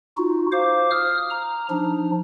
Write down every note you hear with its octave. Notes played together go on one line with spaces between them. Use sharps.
D#4 F4 F#4
C5 F5 D6
D#6 F6
A#5
F3 D4 D#4